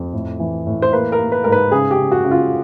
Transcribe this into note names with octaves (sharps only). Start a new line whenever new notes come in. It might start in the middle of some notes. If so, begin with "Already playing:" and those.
Already playing: F2
A2
E3
A2
C5
A#3 B4
A#4
A#3
B4
G#2 A#4
B4
C#3 G#4
G4
C#3
F#4
C#3
F4